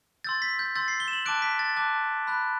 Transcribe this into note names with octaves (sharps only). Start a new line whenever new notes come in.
C6 E6 G6 A6
B6
G6
C6 E6 G6 A6
C7
G7
E7
F#7
A5 D6 F#6 D7
B6
A6
A5 D6 F#6
B5 F#6